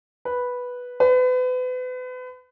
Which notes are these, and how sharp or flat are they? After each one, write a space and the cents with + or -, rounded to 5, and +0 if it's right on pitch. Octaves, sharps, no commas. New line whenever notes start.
B4 -5
B4 +35